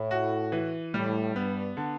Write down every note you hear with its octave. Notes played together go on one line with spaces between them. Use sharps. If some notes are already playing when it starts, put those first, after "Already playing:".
Already playing: A2
F#4
E3
A2 G3
G2 B3
D3